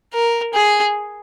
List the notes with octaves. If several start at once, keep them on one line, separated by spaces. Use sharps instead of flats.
A#4
G#4